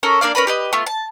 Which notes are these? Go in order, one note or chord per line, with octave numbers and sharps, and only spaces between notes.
C#4 A4 A#4
A#3 D4 D5 F5
C#4 A#4 B4 B5
G4 B4 D#5
A3 B3 F4
A5